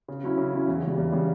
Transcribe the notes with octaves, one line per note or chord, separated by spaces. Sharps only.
C#3
F#3 C#4 E4
C#3
F#3 C#4 E4
E2
C#3 G3
E2
C#3 G3